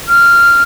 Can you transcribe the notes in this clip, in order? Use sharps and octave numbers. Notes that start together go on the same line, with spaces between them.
F6